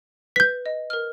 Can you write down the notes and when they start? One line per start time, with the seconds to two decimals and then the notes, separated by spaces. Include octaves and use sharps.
0.36 B4 G6 B6
0.66 D#5
0.90 A#4 F6